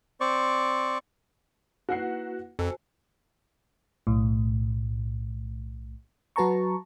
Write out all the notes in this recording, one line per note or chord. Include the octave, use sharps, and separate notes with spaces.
C4 C5 D5 C#6
A#3 E4 F#4 B4 F#5 C7
F2 F#4 A4 C5 G#5
B1 A2
F#3 F#4 B4 A5 A#5 C#6